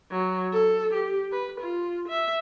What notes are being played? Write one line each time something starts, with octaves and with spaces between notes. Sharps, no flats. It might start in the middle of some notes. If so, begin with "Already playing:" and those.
F#3
A4
G4
B4
F4
E5